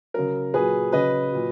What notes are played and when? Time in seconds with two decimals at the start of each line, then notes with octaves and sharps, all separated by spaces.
0.14 C#3 F#3 A#4
0.54 A#2 F#3 G#4 B4
0.92 C#3 F#3 B4 D#5
1.32 A#2 F#3